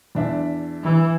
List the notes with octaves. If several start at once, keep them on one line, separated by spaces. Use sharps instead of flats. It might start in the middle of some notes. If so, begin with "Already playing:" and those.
E2 D4 E5
E3